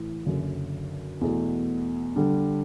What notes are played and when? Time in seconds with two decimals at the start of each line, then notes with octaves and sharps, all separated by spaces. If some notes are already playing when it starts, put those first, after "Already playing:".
Already playing: A1 A2 E3
0.26 F#1 F#2 D3
1.21 E2 B2 A3
2.16 D3 G3 D4